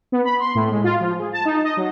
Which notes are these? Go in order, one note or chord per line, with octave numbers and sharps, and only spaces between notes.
B3
B5
C6
A2
G#3
F4
F3
G#4
A5
D#4
D#5
F#3